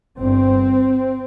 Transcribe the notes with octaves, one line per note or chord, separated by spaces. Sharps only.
G1 G2 C4